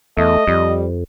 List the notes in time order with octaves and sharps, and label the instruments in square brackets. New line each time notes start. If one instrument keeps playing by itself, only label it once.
[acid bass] E2 [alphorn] A3 [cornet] D#5
[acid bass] F2 [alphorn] G3